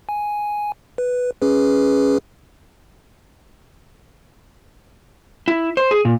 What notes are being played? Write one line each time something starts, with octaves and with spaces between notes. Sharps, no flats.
G#5
B4
C#4 G#4 B4
E4
C5
G#4
A#2